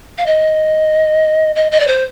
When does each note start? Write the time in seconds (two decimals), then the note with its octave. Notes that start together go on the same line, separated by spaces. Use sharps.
0.18 F5
0.26 D#5
1.55 D#5
1.71 D#5
1.80 D5
1.87 C5